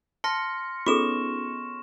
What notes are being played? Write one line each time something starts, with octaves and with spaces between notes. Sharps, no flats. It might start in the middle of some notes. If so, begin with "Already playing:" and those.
A5 C6 F6 A#6 C#7
B3 C#4 D#4 F4 G#4 A4 C#6 E7